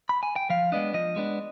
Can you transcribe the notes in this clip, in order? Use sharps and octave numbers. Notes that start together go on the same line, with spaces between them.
B5
G#5
G5
F3 F5
G#3 B3 D4 D#5
F3 D#5
G#3 B3 D4